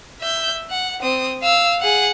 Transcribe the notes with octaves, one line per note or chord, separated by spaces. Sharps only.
E5 G6
F#5
C4 D#6
F5 E6
G#4 F#5